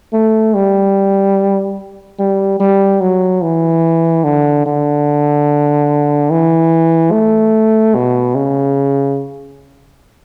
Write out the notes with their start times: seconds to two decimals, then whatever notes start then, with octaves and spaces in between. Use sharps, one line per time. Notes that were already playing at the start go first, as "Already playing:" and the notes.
0.13 A3
0.54 G3
2.19 G3
2.60 G3
3.01 F#3
3.42 E3
4.24 D3
4.66 D3
6.31 E3
7.12 A3
7.95 B2
8.35 C#3